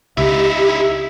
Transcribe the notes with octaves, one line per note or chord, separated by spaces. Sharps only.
C#2 D#4 E4 G4 E5